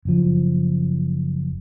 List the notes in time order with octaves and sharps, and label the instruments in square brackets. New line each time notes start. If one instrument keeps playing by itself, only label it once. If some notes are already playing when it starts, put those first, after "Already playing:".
[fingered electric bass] F#1 F3